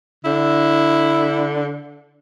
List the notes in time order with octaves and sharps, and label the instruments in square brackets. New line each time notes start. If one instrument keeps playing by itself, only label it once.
[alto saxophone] D3 [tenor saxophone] E4